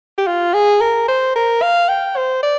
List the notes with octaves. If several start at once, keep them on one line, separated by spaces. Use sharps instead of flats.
G4
F4
G#4
A#4
C5
A#4
F5
G5
C5
D5